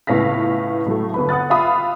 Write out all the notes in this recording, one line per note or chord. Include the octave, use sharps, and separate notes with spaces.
C#2 A2 B3 F5 A#6 B6
A2 F#3 A3
G1 B4 B5
F#5 D#6 F#6 A6
F4 E5 F5 B5 D#6